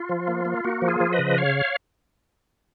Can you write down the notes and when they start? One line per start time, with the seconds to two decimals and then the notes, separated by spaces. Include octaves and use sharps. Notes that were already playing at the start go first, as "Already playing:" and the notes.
Already playing: F4
0.09 F3
0.28 A#3
0.45 A#3
0.64 A#3 F#4
0.82 F3
0.88 F4 G#4
1.00 F3
1.12 B4 D#5
1.19 C#3
1.38 C#5 F5